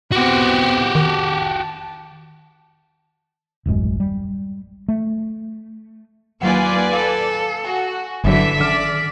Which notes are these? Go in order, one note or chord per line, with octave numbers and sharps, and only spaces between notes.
B3 C4 F#4 G4
D#3 A5
D#1 A1 F#2 G#3
G3
A3
D#2 F#3 F4 B4 D5 F#5 G#5
A4 F5
F#4 G#5
G1 D3 E3 F#3 E5 B6
D#3 D5 F6